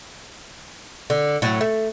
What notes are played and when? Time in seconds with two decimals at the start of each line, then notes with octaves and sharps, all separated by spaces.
1.10 D3
1.42 A2 F#3
1.61 A3